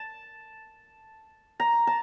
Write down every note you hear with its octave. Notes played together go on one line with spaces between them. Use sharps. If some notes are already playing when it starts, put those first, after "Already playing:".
Already playing: A5
A#5
A5